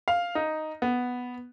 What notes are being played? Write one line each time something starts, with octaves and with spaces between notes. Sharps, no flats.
F5
D#4
B3